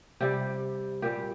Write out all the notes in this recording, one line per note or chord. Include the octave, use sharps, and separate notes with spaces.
C3 G3 G4
A#2 G3 G4